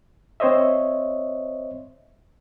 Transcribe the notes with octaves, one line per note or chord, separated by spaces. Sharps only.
C4 C5 C#5 D#5 E5